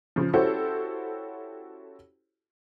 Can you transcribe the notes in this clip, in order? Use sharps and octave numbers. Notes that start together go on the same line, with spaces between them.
C#3 F3
C#4 E4 F#4 G4 A4 C5